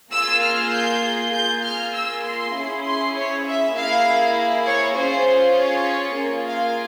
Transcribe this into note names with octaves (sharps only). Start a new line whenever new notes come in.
A#3 F4 G#4 E6
F6
G6
A#3 F4 G#4 G6
F6
E6
C6
C#4 E4 G#4
C6
C#5
E5
A#3 E4 G#4 F5
C#5
C#4 F4 G#4 C5
C#5
A#3 F4 G#4
F5